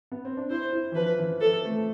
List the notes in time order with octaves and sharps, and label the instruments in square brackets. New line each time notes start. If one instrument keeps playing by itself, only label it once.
[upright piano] B3
C4
D4
[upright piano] E4 [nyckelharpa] C5
[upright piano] E4
E3
[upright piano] F3 [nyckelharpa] B4
[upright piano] E3
[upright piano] F3 [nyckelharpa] A4
[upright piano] A3